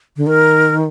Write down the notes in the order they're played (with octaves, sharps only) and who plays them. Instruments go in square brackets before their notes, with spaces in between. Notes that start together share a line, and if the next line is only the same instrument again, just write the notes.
[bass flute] D3
[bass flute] D#3 [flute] A#4